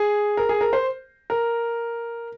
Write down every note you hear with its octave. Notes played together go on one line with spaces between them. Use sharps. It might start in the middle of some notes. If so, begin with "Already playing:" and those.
Already playing: G#4
A#4
G#4
A#4
C5
A#4